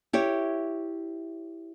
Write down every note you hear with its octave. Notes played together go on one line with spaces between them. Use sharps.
E4 G4 C#5